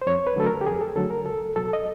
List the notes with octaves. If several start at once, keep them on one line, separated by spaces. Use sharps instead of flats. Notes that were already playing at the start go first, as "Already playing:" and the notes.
C5
F2 C#5
B4
D3 F#3 A3 A4
A#4
G4
F2 G#4
A4
D3 F#3 A3 A4
A#4
C#2 A4
B2 F#3 A4
D#5